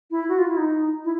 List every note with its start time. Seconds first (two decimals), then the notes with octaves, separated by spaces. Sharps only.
0.11 E4
0.29 F#4
0.38 F4
0.48 E4
0.57 D#4
1.04 E4